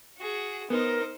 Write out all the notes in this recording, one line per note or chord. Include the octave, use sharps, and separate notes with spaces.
F#4 G#4
B3 D#4 A#4 C5